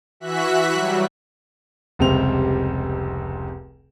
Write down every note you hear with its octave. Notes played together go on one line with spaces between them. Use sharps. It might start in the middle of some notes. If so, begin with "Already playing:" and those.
E3 F#4 E5 F#6 B6
F#3 G3
F1 C#2 C3 G3 C4 F7